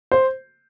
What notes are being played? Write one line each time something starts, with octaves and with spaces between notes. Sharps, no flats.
C5